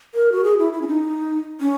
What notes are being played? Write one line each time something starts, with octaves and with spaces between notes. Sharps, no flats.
A#4
F#4
G#4
E4
E4
C#4
D#4
C#4